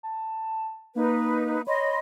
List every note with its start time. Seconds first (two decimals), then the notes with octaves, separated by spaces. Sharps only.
0.03 A5
0.95 A#3 D#4 B4
1.67 C#5 D#5 B5 C6